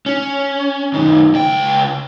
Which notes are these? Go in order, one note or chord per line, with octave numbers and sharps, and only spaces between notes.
C#4
F#2 D#3
C#2 G5